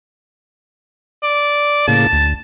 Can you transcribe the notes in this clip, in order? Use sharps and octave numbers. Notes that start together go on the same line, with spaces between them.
D5
A2 C#3 A#3 A5
D2